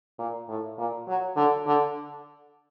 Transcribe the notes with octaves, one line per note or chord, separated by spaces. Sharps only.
A#2
A2
A#2
F#3
D3
D3